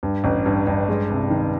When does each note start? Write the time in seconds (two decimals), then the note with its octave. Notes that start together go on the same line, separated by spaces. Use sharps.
0.03 G2
0.24 A1
0.46 G2
0.67 G2
0.88 G#3
1.10 C2
1.30 D#3